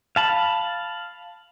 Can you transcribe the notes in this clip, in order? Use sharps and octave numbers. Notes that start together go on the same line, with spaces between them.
F5 A5 B5